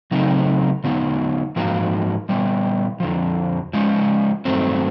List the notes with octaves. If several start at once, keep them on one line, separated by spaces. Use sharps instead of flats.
C#3 F#3 A3 C4 D#4
D3 F#3 B3 D#4
G#2 F3 A#3 D#4 F#4
A#2 G3 B3
F2 D3 F3
F3 G#3 C#4
G2 D#3 F#3 A3 C4